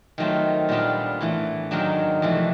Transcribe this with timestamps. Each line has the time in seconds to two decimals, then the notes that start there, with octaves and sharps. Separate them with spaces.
0.18 D#3 F#3 A3 C4 F4
0.69 A#2 G3 B3 D4 F4
1.21 A2 E3 A3
1.71 G#2 D#3 F#3 A#3 D4
2.22 F2 C3 E3 A3 D4